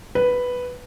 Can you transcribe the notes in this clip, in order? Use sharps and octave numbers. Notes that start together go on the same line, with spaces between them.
B4